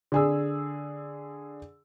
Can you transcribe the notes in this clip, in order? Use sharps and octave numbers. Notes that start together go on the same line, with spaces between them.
D3 G#4 E6